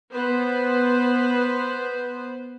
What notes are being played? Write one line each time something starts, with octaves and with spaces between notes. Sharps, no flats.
B3 B4 C5